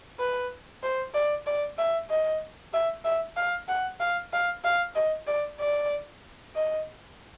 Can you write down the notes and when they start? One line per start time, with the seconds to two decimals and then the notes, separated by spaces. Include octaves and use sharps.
0.20 B4
0.83 C5
1.14 D5
1.47 D5
1.78 E5
2.10 D#5
2.73 E5
3.05 E5
3.37 F5
3.68 F#5
4.00 F5
4.33 F5
4.64 F5
4.95 D#5
5.27 D5
5.60 D5
6.55 D#5